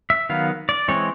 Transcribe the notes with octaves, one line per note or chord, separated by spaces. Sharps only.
E5
D#3 F#3 B3 F5
D5
E3 G#3 C4 C#5